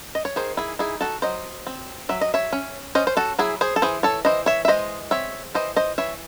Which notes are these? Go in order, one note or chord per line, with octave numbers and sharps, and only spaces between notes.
D#5
C#5
D#3 G#4 C5
E4 G#4
D#4 E4 G#4
F#4 A4
F#3 C5 D#5
C4
F#3 E5
D#5
C#5 E5
C#4
C#4 C5 D#5
C5
F#4 A4
F#3 E4 G#4
G#4 C5
A4
E3 G#4 C5
A4 C#5
E3 C5 D#5
C#5 E5
E5
G#3 C5 D#5
C4 C#5 E5
E3 C5 D#5
C5 D#5
E3 C#5 E5